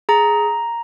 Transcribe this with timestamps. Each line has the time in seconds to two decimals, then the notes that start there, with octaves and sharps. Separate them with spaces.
0.09 G#4 A#5